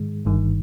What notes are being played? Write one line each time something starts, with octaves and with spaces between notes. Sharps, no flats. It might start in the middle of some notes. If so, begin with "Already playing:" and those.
Already playing: G#2 D#3 G#3
G1 G2 D#3